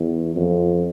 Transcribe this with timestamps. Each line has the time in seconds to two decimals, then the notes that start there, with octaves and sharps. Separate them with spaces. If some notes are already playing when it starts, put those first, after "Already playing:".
Already playing: E2
0.36 F2